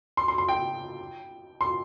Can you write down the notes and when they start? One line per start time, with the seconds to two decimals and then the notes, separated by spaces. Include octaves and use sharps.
0.17 C6
0.28 C6
0.38 C6
0.48 G5
1.61 C6